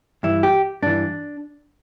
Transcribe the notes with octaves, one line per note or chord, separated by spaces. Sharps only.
G2 E3 E4
G4
G2 E3 D4